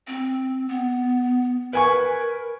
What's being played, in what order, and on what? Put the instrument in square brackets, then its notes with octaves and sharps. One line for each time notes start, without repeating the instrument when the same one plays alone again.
[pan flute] C4
B3
[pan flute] A#4 [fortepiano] B4 G#5 C#6